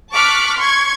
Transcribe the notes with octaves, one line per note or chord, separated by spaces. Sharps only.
A5 C#6 D6 F6 F#6 B6
C6 C#6 G#6